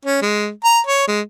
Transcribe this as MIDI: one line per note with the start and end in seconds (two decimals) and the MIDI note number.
0.05 0.19 61
0.22 0.49 56
0.64 0.80 82
0.87 1.06 73
1.08 1.20 56